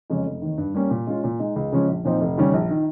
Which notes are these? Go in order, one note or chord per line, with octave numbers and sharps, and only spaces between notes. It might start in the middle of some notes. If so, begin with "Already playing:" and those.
F2 C#3 G#3 C#4
F1
D#2 D#3
G2
G3 A#3 C#4
A#2
G#3 C#4 F4
A#2
G#3 D#4
C#2
C#3 F3 G#3 C#4
A#1
A#2 F3 C4 D#4
F1
D#2 C#3 G3 C#4
A#1
D#3